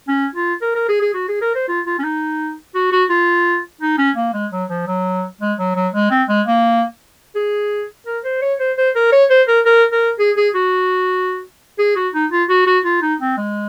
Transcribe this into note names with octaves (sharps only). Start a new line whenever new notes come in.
C#4
F4
A#4
A#4
G#4
G#4
F#4
G#4
A#4
C5
F4
F4
C#4
D#4
F#4
F#4
F4
D#4
C#4
A#3
G#3
F#3
F3
F#3
G#3
F#3
F#3
G#3
C4
G#3
A#3
G#4
A#4
C5
C#5
C5
C5
A#4
C#5
C5
A#4
A#4
A#4
G#4
G#4
F#4
G#4
F#4
D#4
F4
F#4
F#4
F4
D#4
C4
G#3